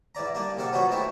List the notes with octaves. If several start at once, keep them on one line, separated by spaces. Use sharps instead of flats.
G#2 E3 D5 A#5
G3 A#3 D4 D5
A#1 C3 A4 F5 F#5 D6
F3 F#3 B3 D#4 F#4 C#5
D#3 E3 G#3 A3 C4 E4